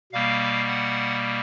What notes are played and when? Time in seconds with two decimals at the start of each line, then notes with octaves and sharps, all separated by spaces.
0.13 B2 G3 A#3 F5
0.67 F#5